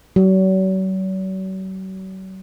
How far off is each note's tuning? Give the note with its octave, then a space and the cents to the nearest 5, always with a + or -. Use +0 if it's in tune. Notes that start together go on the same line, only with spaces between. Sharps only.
F#3 +40